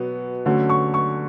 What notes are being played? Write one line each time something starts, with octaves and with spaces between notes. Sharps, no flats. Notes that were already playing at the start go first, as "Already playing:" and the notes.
Already playing: B2 F#3 B3
D2 D3 F#3 A3 C#4
C#6
C#6